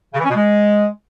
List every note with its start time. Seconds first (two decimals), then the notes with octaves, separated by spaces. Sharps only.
0.14 C#3
0.19 E3
0.24 C#4
0.29 B2
0.34 G#3